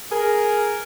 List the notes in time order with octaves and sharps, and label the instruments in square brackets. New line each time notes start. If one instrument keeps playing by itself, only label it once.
[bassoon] G#4 [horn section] A#4